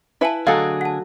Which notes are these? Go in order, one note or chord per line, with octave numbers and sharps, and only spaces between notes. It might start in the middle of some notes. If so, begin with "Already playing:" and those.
E4 B4 E5 F5 G#5 A5
D3 F#3 A3 G#4 A4 D#5 F5 G#5
F#5 A5